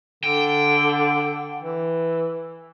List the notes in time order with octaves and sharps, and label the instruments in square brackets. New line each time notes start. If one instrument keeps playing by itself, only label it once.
[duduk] D3 [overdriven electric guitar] G5
[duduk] E3